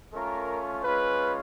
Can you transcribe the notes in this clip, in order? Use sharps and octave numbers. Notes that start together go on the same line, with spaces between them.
A3 C#4 F4 A#4
G#3 C#4 F4 B4